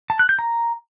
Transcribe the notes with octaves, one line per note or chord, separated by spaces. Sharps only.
A5
F#6
G6
A#5